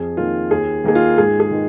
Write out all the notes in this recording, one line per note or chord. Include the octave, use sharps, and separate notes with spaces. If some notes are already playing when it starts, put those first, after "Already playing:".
Already playing: F2 G#4
D#3 A#3 F4
D#2 G#4
D#3 A#3 G#4
F4
G#2 G#4
G#4
D#3 G#3